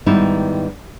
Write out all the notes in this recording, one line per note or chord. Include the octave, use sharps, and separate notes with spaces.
G#2 D#3 G3 B3 D#4 E4